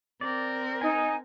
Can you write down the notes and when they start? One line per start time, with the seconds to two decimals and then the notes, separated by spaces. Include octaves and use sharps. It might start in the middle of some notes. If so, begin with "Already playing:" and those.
0.21 C4 A#4 D5
0.81 D#4 G#5